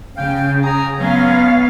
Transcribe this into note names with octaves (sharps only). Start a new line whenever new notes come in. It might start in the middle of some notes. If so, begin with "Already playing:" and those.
C#3 F5 G5
G#5 A#5 D#6
F#3 G#3 B3 C#4 F5